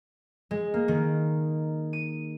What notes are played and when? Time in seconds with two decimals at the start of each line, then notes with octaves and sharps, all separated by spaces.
0.51 G#3
0.74 A#3
0.88 D#3
1.93 D#7